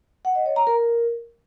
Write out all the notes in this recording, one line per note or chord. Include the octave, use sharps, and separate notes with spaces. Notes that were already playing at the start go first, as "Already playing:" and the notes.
F#5
D#5
C#5
A#5
A#4